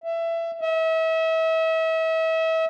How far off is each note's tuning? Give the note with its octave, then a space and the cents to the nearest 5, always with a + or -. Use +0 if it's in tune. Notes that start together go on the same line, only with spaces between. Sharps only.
E5 +20
E5 -35